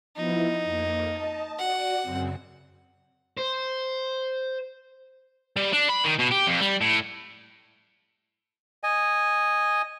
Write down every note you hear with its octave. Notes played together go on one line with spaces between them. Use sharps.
F3 B3 D#4 E4
F2 A#3
D#5 A5
F#4 D5 F#5
F#2 C#3 C4
C5
G3
D4
B5
D#3
B2
G4
F2
G3
A2
D#5 G#5